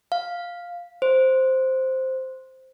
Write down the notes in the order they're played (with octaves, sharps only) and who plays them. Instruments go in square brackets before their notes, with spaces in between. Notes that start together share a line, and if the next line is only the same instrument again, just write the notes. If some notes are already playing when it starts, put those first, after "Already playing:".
[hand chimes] F5
C5